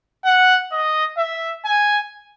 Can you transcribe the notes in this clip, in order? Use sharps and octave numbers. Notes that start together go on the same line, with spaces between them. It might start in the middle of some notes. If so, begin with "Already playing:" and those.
F#5
D#5
E5
G#5